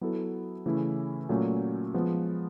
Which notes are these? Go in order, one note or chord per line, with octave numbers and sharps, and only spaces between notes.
F#3 B3 E4 A4
C#3 E3 A3 C#4 E4
A#2 F#3 A3 C#4
F3 G#3 B3